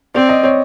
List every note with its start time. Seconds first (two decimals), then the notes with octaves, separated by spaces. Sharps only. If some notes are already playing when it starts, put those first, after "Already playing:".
0.14 C4 D5
0.29 D#5
0.43 C#5